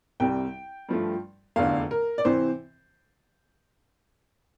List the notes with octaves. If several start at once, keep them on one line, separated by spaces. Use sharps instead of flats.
C2 C3 G3 G5
G2 F3 A3
F1 E2 D3 F5
A#4
D5
C3 E3 C5